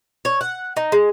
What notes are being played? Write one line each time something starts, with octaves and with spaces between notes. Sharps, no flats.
C#5
F#5
D#4
G#3